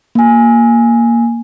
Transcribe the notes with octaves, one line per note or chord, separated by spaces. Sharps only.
A#3 G#5